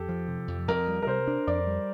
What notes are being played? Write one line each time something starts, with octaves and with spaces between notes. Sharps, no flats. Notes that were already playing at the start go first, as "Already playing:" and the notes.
Already playing: F2 G4 A4
F3
C3
F2
F2 A#4
G3
A#4
C3 C5
D4
F2 D5
G3